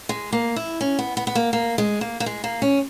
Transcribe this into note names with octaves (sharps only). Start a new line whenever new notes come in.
G#3
A#3
E4
C#4
B3
B3
B3
A#3
A#3
G#3
A#3
A#3
G#3
A#3
C#4